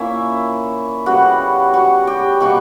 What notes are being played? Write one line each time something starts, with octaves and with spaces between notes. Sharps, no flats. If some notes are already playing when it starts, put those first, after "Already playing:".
Already playing: A#2 A#3 C#4 E4 E5
C#3 G3 B3 F#4 F#5
F#4 F#5
G4 G5
B2 G3 A#3 C#4 F#4 F#5